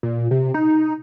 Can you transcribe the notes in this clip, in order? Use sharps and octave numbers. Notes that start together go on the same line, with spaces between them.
A#2
C3
D#4